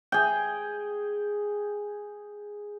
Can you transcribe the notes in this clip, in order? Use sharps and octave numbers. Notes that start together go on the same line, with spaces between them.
G#4 G5